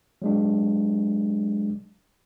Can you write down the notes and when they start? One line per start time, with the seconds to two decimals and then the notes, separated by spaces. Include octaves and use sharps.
0.22 F#3 G#3 D4